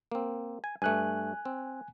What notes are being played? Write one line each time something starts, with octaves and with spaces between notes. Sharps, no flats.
A#3 C4
G#5
G2 A3 G#5 F#6
C4